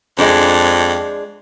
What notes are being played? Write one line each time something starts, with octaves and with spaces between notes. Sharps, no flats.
F2 G#3 D4